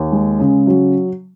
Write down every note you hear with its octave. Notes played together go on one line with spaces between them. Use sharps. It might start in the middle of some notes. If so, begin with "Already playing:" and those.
Already playing: D#2
G#3
C#3
F#3